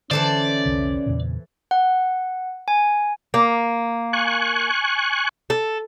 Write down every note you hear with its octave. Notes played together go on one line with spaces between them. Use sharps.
D3 E3 C#4 A4 C5 D5
F1 C2 D3
E2 A#2 C#3
F#5
G#5
A#3
G#5 C#6 F#6
A4